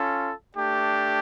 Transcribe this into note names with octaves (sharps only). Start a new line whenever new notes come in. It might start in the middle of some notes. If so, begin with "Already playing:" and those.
Already playing: C#4 F4 A4
A3 D4 G4